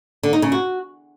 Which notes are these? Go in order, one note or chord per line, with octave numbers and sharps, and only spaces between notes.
D3
D#4
C#3
F#4